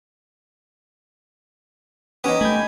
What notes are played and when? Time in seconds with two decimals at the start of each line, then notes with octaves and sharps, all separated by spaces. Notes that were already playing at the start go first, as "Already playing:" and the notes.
2.24 B3 C#4 D#4 G4 D#6
2.41 A3 G5 G#5 B5